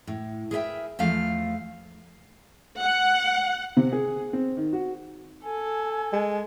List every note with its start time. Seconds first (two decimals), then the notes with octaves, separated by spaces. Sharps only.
0.07 A2
0.51 G#4 A#4 B4 C#5 E5 G5
0.99 E2 F3 A3 F5
2.81 F#5
3.77 C3
3.92 G#4
4.33 C4
4.57 D#3
4.73 F#4
5.44 A4 G#5
6.13 G#3